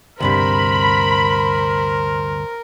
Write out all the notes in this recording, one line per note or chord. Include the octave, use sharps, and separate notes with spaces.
D2 G2 C3 A#4 C5 B5